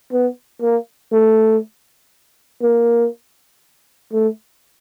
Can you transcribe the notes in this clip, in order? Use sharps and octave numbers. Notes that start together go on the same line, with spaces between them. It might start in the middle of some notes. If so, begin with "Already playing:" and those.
B3
A#3
A3
A#3
A3